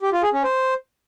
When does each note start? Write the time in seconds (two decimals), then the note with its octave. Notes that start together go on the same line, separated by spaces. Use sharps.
0.02 G4
0.12 F4
0.23 G#4
0.33 C#4
0.43 C5